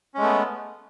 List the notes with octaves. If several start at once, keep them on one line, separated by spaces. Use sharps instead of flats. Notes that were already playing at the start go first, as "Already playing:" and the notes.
G#3 A3 B3 C#4